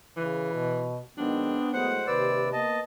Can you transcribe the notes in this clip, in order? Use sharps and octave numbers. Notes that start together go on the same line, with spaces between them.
C#3 E3
B2
G#2 D#3 F#3 B3 C4 D4
A2 F#3 G#3 C5 F#5
D#2 C3 B4 D5 E6
A#3 B3 D#5 A5